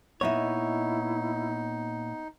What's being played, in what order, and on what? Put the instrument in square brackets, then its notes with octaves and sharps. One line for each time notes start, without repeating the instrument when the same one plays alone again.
[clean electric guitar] A#2 C#5 [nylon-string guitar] B3 D#5 E5 [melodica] D#4 [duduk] E4